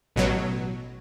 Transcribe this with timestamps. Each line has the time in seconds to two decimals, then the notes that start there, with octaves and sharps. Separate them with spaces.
0.16 A1 B2 F#3